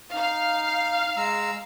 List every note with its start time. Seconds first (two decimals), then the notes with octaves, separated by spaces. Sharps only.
0.13 D#4 F5
1.16 G#3 A#5 E6